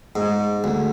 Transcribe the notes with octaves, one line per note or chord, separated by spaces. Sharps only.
G#2
D2